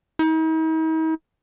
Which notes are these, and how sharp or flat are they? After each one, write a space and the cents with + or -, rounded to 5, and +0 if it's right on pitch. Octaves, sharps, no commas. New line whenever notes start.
D#4 +45